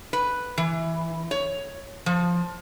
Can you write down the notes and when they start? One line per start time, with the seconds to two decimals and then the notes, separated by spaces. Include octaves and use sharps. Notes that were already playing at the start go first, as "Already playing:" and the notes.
0.13 B4
0.58 E3
1.31 C#5
2.06 F3